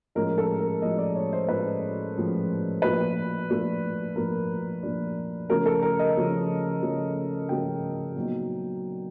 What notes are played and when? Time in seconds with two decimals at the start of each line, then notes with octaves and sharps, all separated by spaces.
0.15 A2 F3 G#3 C#4 A#4
0.38 A4
0.60 A#4
0.82 A2 F3 G#3 C#4 D#5
0.99 D5
1.15 C#5
1.33 C5
1.49 A2 F3 G#3 C#4 B4
2.15 A2 F3 G#3 C#4
2.82 A#2 F3 A3 D4 B4
3.49 A#2 F3 A3 D4
4.15 A#2 F3 A3 D4 A#4
4.83 A#2 F3 A3 D4
5.49 C#3 F3 A3 C#4 A#4
5.66 A4
5.82 A#4
5.99 D#5
6.16 C#3 F3 A3 C#4
6.82 C#3 F3 A3 C#4
7.49 C#3 F3 A3 C#4 G5
8.16 A#2 F#3 B3 D#4